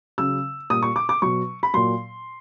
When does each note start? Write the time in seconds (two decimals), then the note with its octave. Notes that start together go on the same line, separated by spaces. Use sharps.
0.18 C#3 F#3 E6
0.70 A#2 G3 D#6
0.82 C#6
0.96 D6
1.09 D6
1.22 B2 F#3 C#6
1.63 B5
1.74 A#2 F#3 C6